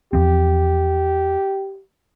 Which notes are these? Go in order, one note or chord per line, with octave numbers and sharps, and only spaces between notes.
E2 F3 C4 G4